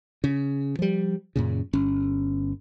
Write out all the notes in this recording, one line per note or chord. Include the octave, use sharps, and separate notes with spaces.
C#3
F3 G3
F#2 A#2 C#3
G1 C#4